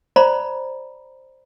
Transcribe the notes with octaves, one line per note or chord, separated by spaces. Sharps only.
C5 D5 A#5 B5